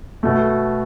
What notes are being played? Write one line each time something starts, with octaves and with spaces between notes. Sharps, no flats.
B2 A3